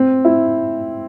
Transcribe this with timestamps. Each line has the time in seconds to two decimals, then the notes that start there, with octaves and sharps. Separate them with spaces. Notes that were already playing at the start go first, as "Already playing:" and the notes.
Already playing: C4
0.25 E4